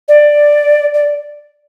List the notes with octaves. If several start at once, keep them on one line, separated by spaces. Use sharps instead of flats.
D5
D5